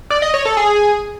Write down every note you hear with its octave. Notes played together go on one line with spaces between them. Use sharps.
D5
D#5
C#5
A4
G#4